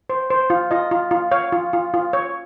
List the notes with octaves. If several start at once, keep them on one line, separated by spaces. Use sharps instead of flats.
C5
C5
F4
F4 D#5
F4
F4
C#5 F5
F4
F4
F4
C#5